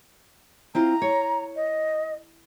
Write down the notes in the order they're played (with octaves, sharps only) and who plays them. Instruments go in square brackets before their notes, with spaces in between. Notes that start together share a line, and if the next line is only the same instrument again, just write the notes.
[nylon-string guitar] C4 E4 F4 [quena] A#5
[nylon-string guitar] C#5
[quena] D#5